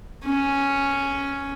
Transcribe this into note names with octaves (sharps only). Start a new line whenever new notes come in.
C#4